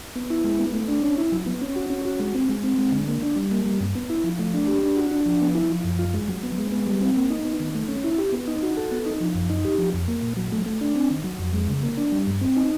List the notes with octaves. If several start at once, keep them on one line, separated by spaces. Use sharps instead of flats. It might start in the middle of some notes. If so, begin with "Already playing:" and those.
B3
E4
G#3
B3
A3
D4
C#4
E4
F#3
B3
C#4
F#4
C#4
F#4
G#3
C4
G#3
C4
G#3
D3
A#3
D4
G3
A#3
G3
G2
B3
E4
F3
A3
D4
G4
D4
F#4
D4
F3
B3
E4
F3
F#2
F4
G#3
F#3
B3
G#3
B3
G3
C4
A#3
D#4
B3
D#3
A3
C#4
E4
G4
B3
D#4
F#4
A4
B3
D#4
F3
F#2
D#4
G4
F3
F2
A#3
A#2
F#3
A3
A3
D4
C4
D#3
F#3
F2
G#3
C#3
A#3
D4
G3
G2
C4
D#4